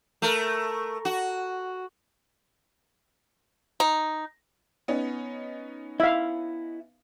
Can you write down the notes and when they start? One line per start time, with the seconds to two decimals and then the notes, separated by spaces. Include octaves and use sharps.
0.22 A3 A#4
1.05 F#4
3.80 D#4
4.88 B3 C#4 D#4
6.00 E4 E5 F5